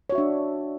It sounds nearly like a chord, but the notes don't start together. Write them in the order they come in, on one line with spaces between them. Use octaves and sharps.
C#5 F#4 E5 D4